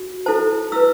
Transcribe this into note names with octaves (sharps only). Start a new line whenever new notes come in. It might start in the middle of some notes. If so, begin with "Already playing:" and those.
Already playing: F#4
E4 A4 C5 A5
E4 B4 E6